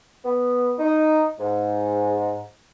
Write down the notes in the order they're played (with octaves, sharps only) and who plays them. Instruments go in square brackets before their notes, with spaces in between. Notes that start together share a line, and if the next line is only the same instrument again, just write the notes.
[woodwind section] B3
D#4
G#2